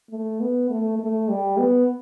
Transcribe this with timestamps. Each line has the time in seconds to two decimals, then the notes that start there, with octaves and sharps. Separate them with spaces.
0.11 A3
0.40 B3
0.70 A3
0.99 A3
1.29 G3
1.58 B3